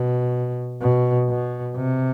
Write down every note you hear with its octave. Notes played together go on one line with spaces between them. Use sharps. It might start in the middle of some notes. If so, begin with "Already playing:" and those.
Already playing: B2
B2
B2
C3